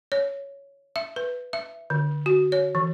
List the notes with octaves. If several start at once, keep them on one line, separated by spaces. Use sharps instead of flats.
C#5
E5
B4
E5
D3
F#4
C#5
E3